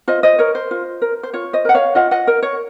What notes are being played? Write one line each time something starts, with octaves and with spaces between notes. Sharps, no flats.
F4 C5 D#5
C5 D#5
A#4 C#5
C5
F4
A#4
C5
F4 C#5
C5 D#5
A#4 F#5
C#5 F5
F4 D#5 F#5
D#5 F#5
A#4
C#5